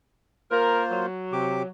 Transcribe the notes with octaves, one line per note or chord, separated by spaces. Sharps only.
A#3 F4 A#4 C5
F#3
C3 G4 D6